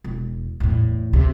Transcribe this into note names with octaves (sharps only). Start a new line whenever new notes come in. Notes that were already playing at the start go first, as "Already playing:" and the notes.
E1
E2 A2
D2 C3